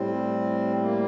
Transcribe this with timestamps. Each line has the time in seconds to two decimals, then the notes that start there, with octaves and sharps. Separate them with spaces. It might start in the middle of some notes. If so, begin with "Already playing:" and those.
Already playing: A2 G3 C4
0.81 A#3